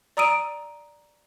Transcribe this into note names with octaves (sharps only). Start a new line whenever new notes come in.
D5 A#5 D#6 E6 D7 D#7